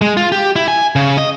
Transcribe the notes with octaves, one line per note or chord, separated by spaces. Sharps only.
G#3
F4
G4
E4
G#5
C#3
D#5